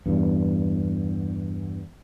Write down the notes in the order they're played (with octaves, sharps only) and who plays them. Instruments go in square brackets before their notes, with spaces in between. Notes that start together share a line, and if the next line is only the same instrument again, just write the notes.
[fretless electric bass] E2 G2